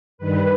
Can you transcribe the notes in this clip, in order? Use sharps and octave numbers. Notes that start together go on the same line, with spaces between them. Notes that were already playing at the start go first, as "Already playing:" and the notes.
G2 D#3 G3 B4